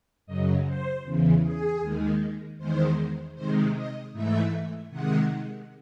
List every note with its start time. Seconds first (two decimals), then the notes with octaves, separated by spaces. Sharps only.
0.27 F#2 C#3 F#3 D#5
0.66 C5
1.04 E2 C#3 E3
1.42 G#4
1.81 D#2 D#3 G#3
2.58 E2 D#3 G#3 C5
3.35 C3 D#3 G#3 C5
3.74 D#5
4.12 G#2 E3 A3 E5
4.90 C3 D#3 G#3 F#5